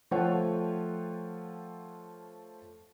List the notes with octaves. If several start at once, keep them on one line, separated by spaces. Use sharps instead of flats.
F3 A3 F4 C#5 F#5 G5